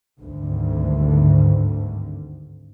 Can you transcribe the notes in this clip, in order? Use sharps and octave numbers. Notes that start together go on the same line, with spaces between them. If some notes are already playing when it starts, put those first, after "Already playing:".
G#1 D2 G2 D3